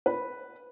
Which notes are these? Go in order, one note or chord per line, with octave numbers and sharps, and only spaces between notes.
B4